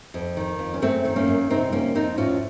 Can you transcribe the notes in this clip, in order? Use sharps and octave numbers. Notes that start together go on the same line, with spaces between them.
F2
D#3
F2
C#4
F#2 A3 C4
D#3
A#3 C#4
F#2
C3 C4 D#4
F2 A#3 C#4
F2 C4 D#4
A2 C#4 F4